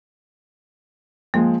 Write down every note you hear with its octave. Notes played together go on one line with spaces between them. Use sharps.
F3 G#3 A#3